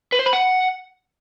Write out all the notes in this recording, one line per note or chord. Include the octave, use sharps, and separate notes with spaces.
B4
C5
B5
F#5